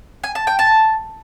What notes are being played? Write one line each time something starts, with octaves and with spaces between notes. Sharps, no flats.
G#5
A5
G5
A5